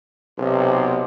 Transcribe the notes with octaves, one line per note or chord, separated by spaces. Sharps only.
B1 C3